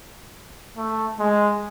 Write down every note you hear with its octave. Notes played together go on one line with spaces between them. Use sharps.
A3
G#3